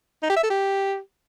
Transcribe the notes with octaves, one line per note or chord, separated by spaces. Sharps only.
D#4
G4
E5
A4
G4